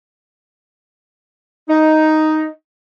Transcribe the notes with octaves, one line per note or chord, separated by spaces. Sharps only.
D#4